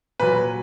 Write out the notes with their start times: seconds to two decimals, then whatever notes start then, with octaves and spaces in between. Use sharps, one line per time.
0.20 A#2 F#3 B4